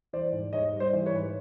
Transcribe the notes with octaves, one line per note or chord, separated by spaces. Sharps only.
E3 C5 D5
G#2
G#2 C#5 D#5
G3
C5 D5
E3
B4 C#5
G#2